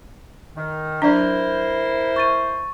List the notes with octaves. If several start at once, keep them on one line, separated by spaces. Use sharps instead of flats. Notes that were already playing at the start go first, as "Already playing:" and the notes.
D#3
F#3 D4 E4 A#4 C5
C#6 A6 D#7